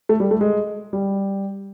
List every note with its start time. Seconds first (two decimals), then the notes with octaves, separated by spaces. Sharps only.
0.09 A3
0.20 G3
0.31 A3
0.41 G#3
0.93 G3